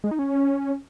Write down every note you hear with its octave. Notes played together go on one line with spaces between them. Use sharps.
G#3
D#4
C#4